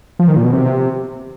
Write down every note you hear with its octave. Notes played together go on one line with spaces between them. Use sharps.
F3
D#3
A#2
B2
C3